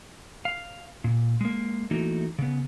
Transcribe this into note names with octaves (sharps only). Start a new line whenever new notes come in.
F5
A#2
G#3 A#3
E3 A3 A#3 D#4 F#4
C#3 B3